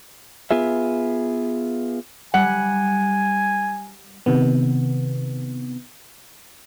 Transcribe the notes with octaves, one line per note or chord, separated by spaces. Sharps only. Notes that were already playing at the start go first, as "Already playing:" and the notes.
B3 F4 G#4 E5
G3 F#5 G#5
C3 D#3 B3